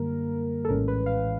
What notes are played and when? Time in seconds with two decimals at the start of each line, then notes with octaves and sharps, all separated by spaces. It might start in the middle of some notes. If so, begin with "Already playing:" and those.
Already playing: F#2 D3 G3 A#3 A#4
0.65 A4
0.69 A#1 A2 E3 G#3 C#4 A#4
0.88 B4
1.06 F5